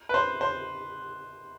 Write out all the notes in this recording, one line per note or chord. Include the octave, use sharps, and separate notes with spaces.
B4
C5
C5